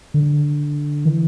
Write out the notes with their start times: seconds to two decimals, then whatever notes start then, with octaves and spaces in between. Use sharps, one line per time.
0.14 D3
1.05 E3